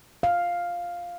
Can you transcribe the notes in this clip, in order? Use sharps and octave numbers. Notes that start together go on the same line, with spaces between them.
F5